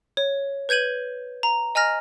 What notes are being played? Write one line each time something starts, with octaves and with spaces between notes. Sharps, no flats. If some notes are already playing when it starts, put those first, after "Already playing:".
C#5
B4 G6 G#6 D#7 F#7
A#5
D#5 G#5 A#5 F6 A#6